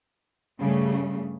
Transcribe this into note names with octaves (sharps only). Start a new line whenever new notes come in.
G2 C#3 G3 A3